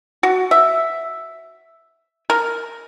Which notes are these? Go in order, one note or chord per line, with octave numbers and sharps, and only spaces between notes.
F#4
E5
A#4